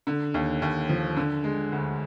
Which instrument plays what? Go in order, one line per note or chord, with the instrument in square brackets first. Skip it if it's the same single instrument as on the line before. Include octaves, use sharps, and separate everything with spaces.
[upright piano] D3
D#2
D#2
F3
D3
G#3
D2